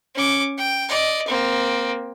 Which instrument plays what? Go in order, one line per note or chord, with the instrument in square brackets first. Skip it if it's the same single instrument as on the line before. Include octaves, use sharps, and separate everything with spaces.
[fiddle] C#4 D6
G5
D5 D#5
A#3 C4